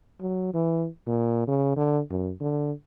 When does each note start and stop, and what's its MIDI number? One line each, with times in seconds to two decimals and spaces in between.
0.20 0.51 54
0.54 0.87 52
1.07 1.45 46
1.48 1.76 49
1.77 2.00 50
2.10 2.32 42
2.40 2.72 50